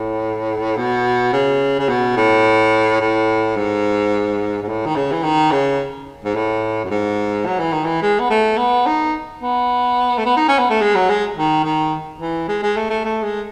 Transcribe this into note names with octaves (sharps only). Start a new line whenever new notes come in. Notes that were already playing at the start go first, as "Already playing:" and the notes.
Already playing: A2
B2
C#3
C#3
B2
A2
A2
G#2
G#2
A2
D#3
C#3
E3
D#3
C#3
G#2
A2
F#2
G#2
F#3
E3
D#3
E3
G#3
B3
A3
B3
D#4
B3
A3
B3
D#4
C#4
B3
A3
G#3
F#3
G#3
D#3
D#3
E3
G#3
G#3
A3
A3
A3
G#3